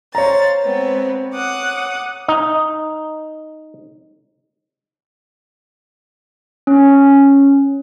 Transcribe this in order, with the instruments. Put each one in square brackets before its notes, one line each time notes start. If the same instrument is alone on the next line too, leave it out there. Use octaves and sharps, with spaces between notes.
[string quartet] C5 F5 A6 [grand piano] C#5 A#5
[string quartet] G#3 B3 C4
F#5 D6 D#6
[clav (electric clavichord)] D#4
[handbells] C#4